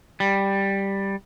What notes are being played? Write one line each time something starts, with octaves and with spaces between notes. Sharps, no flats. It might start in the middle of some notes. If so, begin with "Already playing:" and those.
G3